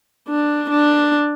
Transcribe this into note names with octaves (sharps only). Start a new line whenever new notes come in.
D4
D4